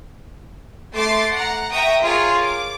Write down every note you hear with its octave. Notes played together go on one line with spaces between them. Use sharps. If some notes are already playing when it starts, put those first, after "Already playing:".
A3 C6 D6 A6 C7
F#5 A#5
E5 G5 A#5 C#6 D#6
F4 G#4 A#4 C#5
D6